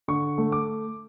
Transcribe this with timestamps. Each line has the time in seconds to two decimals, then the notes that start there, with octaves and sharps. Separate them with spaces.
0.08 D3 C#6
0.38 A3
0.52 D6